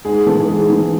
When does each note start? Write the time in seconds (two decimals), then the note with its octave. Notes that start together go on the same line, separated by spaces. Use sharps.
0.05 G#2 G#4
0.27 E3 A4
0.48 G#2 G#4
0.70 E3